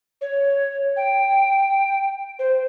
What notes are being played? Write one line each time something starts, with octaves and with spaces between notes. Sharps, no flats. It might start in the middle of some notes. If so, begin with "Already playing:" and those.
C#5
G5
C5